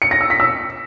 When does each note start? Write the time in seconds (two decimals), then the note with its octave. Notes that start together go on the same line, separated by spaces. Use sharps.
0.02 C#7
0.11 A#6
0.21 E6
0.30 B6
0.40 E6